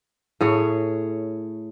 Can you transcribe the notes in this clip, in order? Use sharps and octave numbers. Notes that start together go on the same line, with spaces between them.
A2 G#4 C#5